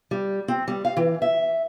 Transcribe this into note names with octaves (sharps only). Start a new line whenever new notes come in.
G3
C4
G3
F5
E3
E5